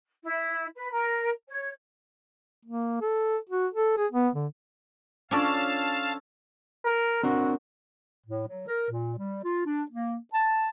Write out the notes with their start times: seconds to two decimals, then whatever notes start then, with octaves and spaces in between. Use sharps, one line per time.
0.23 E4
0.75 B4
0.90 A#4
1.48 C#5
2.66 A#3
3.02 A4
3.49 F#4
3.74 A4
3.97 G#4
4.12 B3
4.35 D3
5.31 F3 C#4 D4 A4 C#5 D5 F5 A5
6.85 A#4
7.23 C4 D4 F#4 A#4
8.26 A2
8.47 F#3
8.67 A#4
8.91 A#2
9.19 G3
9.44 F4
9.65 D4
9.91 A#3
10.33 A5